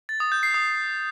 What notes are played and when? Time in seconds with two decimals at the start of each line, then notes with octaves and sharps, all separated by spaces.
0.09 A6
0.20 D#6
0.32 G6
0.43 C7
0.54 D#6